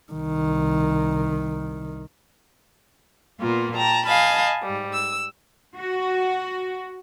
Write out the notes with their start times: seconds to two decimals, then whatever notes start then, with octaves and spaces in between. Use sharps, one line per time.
0.12 C2 D#3
3.39 A#2 A#3 B3 F4
3.77 G5 A5 A#5
4.06 D#5 F5 G#5 A5 B5
4.63 G#2 G3
4.94 E6
5.78 F#4